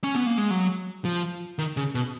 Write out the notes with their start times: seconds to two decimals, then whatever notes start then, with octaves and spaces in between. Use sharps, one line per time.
0.04 C#4
0.15 B3
0.26 A#3
0.38 G#3
0.50 F#3
1.05 F3
1.59 D#3
1.77 C#3
1.95 B2